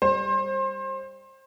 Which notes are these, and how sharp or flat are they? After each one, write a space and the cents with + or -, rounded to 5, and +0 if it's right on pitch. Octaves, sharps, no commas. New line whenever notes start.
G3 +10 C5 +25